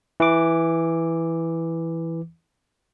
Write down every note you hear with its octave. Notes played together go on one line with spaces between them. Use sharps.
E3 D6